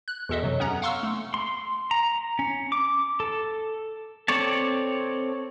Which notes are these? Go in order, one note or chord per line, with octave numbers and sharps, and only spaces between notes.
F#6
E2 B2 A4 D#5 E5
F#2 C3 F#3
B3 C#4 F#5 A#5
F5 F#5 C6 C#6 E6 F6
A3
C6
A#5
C#4
D6
A4
C4 A4 C#5 D5 A5